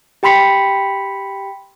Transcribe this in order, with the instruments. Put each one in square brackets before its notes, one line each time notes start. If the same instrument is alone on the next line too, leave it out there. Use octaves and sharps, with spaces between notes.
[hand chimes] G4 G5 B5 C6 B6 C#7